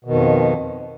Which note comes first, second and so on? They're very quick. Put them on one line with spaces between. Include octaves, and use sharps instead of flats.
B2 D#3 F2